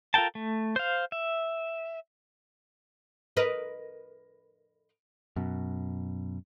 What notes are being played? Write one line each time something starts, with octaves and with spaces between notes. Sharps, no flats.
F4 A4 A#4 G5 A5
A3
C5 F5
E5
A#4 B4 D#5
F#2 B2